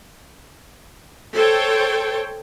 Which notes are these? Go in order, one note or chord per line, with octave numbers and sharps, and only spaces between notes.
A4 C5 C#5 G5